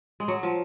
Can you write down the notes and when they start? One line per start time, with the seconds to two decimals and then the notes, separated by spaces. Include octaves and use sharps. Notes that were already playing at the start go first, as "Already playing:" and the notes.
0.20 G#3
0.28 F#3
0.43 F3